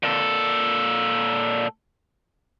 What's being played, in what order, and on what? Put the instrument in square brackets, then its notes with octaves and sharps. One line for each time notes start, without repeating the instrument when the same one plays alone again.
[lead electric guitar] A#2 A4